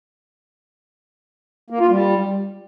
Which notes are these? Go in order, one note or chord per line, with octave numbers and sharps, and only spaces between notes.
A#3
F4
G3